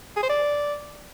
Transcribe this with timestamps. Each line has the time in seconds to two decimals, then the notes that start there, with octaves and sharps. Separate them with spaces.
0.16 G#4
0.23 C5
0.29 D5